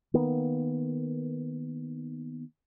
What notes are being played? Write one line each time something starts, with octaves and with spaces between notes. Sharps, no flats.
D#3 A#3 B3